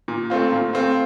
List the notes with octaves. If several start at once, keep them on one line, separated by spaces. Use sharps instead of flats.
A#2
A3 C4 F4
A#2
A3 C4 F4